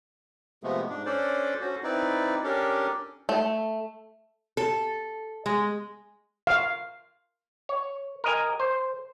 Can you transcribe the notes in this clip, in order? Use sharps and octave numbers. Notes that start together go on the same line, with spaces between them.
C3 F3 G#3 A3 B3
G#2 D4
C#4 D4 A4 C5 D5
C#4 F#4 A4 C5
C4 D#4 E4 B4 D5
C#4 D4 G4 A4 A#4
A3
A4
G#3
F5
C#5
A#4 D#5 G#5
C5